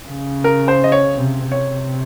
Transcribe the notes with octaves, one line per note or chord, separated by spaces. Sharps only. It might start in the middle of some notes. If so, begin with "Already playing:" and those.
C#3
A#4
C5
D#5
C#5
C3
C3 C#5